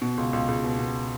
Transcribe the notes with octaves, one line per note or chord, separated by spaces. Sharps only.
B2
C#2
C#2
C#2
B2
B2